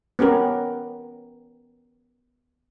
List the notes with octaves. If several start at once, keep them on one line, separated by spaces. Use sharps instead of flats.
B3 C#4 G4 A#4